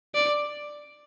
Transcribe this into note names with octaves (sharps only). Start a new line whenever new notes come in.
D5